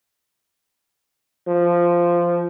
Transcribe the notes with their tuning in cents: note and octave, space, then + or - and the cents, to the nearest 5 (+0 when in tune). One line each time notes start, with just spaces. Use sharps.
F3 -10